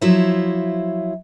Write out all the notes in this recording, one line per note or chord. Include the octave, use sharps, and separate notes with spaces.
F3 F#3 E4 C5 C#5 E5